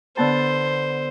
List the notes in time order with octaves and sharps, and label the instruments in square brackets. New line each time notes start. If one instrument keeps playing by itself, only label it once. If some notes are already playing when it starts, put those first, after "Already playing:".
[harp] D3 B3 A5 [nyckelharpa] C5